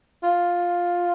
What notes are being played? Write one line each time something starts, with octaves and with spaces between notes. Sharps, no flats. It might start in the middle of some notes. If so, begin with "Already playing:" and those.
F4